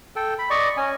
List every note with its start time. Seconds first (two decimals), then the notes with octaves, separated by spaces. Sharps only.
0.16 A4 G5
0.39 B5
0.50 D5 D#5 C#6
0.77 C#4 G#5